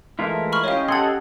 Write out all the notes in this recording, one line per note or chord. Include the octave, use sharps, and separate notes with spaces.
E3 G#3 A3 E4 F4 A#4
B5 C#6 F6
C#4 G4 C#5 D#5 F5
G#4 A4 F#5 C6 G#6